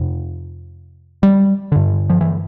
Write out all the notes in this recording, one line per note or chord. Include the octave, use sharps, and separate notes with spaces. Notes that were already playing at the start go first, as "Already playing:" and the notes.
Already playing: F2 C3
G3
G2 D3
F3
E3